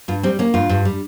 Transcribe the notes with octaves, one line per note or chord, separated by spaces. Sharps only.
G2 F4
G3 C4
A#3 C#4
G2 F4
G2
G3